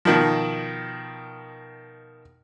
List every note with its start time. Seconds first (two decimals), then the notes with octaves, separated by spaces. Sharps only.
0.05 B2 D#3 F3